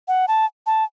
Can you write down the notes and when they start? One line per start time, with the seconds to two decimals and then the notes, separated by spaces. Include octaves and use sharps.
0.08 F#5
0.28 A5
0.67 A5